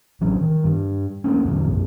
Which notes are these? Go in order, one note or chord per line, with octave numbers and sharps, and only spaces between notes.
A1 E3 F#3 C#4
D#3
G2
A3 A#3 C#4
E2 G#2 D3 F#3
B1 F#2